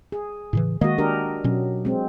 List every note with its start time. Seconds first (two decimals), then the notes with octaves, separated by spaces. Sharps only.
0.12 G#4
0.53 A2 C#3 E3
0.81 D#3 G#3 A#3 F#4 D#5
0.98 D4 G4 A#4
1.44 B2 F#3 C#4
1.85 G#3 C4